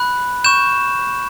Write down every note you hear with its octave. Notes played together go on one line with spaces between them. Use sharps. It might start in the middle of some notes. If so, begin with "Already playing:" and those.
Already playing: B5 F#6
C#6 G6 E7